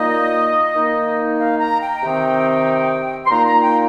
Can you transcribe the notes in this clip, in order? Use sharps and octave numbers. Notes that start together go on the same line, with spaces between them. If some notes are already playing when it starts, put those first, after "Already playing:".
Already playing: A#2 A#3 D#4 D#5
D#3 A#3 D#4
F5
A#5
G5
C3 D#3 C4 D#4
C6
A#2 A#3 D#4 A#5
A#5
G5